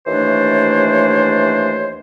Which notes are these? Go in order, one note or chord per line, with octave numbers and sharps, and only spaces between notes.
D#2 E3 A3 D4 C5 C#5